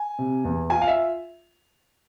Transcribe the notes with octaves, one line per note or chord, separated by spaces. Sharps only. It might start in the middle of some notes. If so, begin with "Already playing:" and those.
Already playing: G#5
C3
E2
F4 G#5
F5
E5